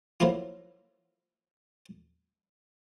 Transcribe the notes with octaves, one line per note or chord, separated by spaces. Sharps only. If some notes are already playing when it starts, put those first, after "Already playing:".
F3 F#3 A#3 E4 F4